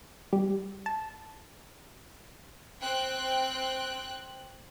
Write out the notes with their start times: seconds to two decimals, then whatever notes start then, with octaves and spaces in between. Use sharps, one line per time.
0.33 G3
0.86 A5
2.82 C4 G5 F#6